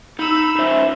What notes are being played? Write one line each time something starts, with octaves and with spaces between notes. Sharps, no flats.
D#4 B5 E6
C#4 F4 C5 E5